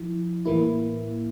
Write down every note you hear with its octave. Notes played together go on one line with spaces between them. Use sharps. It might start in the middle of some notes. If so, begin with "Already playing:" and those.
Already playing: F3 E4
A2 E3 A#3 E4